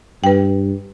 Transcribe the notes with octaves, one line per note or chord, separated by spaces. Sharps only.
G2 B4 G5